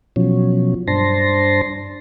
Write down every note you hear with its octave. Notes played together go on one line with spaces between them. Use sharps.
B2 F3 F#3 C#4
G2 D4 C5 A5 C6 A#6